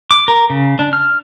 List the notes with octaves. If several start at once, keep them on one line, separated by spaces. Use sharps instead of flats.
D6
A#4
C#3
D4
F6